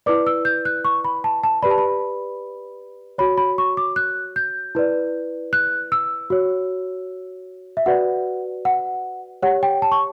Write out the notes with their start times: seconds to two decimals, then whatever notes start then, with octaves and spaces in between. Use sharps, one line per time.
0.06 E4 B4 D5 D6
0.27 E6
0.45 G6
0.65 F#6
0.85 C#6
1.04 B5
1.24 A5
1.44 A5
1.63 G4 B4 D5 B5
1.71 A5
1.78 B5
3.18 F#4 C#5 B5
3.38 B5
3.58 C#6
3.77 D6
3.96 F#6
4.36 G6
4.75 E4 B4 D5
5.53 F#6
5.92 E6
6.30 F#4 C#5
7.77 E5
7.86 F#4 B4 D5 F#5
8.65 F#5
9.43 G4 C#5 F#5
9.63 G5
9.82 A5
9.92 C#6